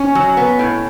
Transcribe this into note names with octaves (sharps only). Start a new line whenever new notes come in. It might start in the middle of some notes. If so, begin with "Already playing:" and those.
Already playing: C#4
F#3
B3
A2